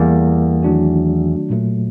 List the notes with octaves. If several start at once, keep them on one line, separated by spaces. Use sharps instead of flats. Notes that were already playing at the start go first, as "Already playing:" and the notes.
Already playing: E2 E3 G3 A#3
D#3 F#3 A3 D4 F#4
A#2 F#3 A3